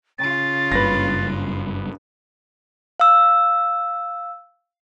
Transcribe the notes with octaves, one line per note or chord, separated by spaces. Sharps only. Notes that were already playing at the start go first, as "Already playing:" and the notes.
C#3 F4 A6
F#1 G2 B4 A#6
F5 E6